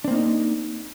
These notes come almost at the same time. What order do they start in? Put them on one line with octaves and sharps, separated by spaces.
D4 C4 A#3 D#4